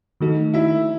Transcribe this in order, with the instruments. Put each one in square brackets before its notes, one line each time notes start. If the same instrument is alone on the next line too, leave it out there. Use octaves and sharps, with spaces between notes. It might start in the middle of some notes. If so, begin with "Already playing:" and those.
[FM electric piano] D#3 A3 D#4 F#4 A4
[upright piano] E4 E5